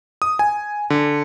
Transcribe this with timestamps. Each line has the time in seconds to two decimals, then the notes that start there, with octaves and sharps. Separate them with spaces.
0.22 D#6
0.39 G#5
0.90 D3